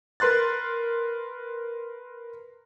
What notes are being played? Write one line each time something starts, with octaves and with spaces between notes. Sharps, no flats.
A#4 B4 C6 F#6 A6